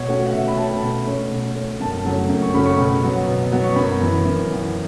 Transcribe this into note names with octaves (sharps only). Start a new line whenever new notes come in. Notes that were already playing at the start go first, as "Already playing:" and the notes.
Already playing: B2 C#5
A3 C#4 F#4
F#5
B2 E5
B5
A3 C#4 A5
B2
A3 C#4
B2
A3 C#4
F#2 A5
C#3 F#3 A3 C#4
F#2
C#6
C#3 F#3 A3 C#4 B5
C#6
B2
F#3 B3
B2
F#3 B3
C#6
F#2 B5
E3 B3
F#2
E3 B3